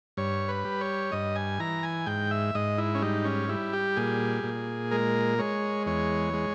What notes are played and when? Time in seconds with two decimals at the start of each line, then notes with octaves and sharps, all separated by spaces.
0.17 G2 C#5
0.48 B4
0.65 G3
0.81 C#5
1.12 G2 D#5
1.36 G#5
1.60 E3 A#5
1.83 G#5
2.06 G#2 G5
2.31 E5
2.55 G#2 D#5
2.78 E4
2.95 C#4
3.02 G3 D#4
3.25 C#4
3.49 G3 E4
3.73 G4
3.97 A#2 G#4
4.44 A#2
4.91 G#3 A#4
5.38 G#3 C#5
5.86 E2 C#5
6.33 G#3